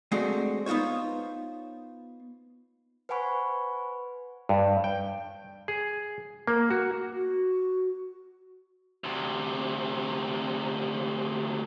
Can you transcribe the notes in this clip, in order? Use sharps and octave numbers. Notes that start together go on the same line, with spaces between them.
G#3 A3 C4 D4 F#4
B3 D#4 F4 C5 C#5
B4 C5 F#5 G#5 B5 C#6
G2
G5
G#4
A#3
F#4
F#4
D2 C3